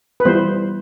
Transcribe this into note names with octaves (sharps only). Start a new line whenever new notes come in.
B4
E3 G3 B3 C5